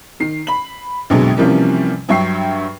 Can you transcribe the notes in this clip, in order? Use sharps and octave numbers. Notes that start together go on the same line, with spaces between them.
D#3 C7
B5 F#7
A#1 F2 B2 D3 F#3 G#3
C3 E3 F3 G3 A#3 C#4
G2 F#3 E5 G5 C#6 C7